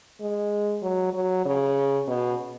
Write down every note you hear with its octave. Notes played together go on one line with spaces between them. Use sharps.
G#3
F#3
F#3
C#3
B2